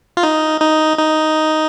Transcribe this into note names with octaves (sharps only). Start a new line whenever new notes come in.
F4
D#4
D#4
D#4